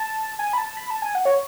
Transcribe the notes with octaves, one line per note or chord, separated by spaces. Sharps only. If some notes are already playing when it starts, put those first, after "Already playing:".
Already playing: A5
G#5
B5
A5
B5
A5
G#5
F#5
C#5